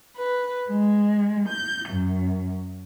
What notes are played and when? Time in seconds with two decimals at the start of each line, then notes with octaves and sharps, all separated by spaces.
0.17 B4
0.70 G#3
1.48 G6
1.89 F#2